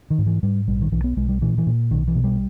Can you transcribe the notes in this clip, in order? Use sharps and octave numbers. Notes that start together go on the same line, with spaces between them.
D#3
G#2
E3
G#2 G3
A#1 G3
D#3
B1 E3
B3
B1 G#3
G3
A#2 E3
E3
A#2
B1 D#3
E3
B2
G3